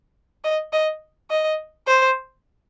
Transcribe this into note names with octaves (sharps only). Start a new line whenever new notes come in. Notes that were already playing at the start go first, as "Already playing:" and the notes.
D#5
D#5
D#5
C5